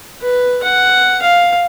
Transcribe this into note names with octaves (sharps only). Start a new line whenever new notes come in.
B4
F#5
F5